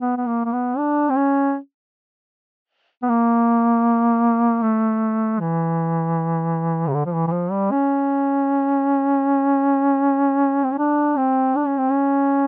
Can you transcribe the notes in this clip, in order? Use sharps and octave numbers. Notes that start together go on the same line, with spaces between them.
B3
B3
A#3
A#3
B3
D4
C4
C#4
B3
A#3
A3
E3
C#3
D3
F3
E3
E3
F3
G3
C#4
C4
C#4
D4
C4
D4
C#4
C4
C#4